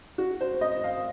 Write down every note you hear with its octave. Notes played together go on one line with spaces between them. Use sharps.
F#4
C5
D#5
F5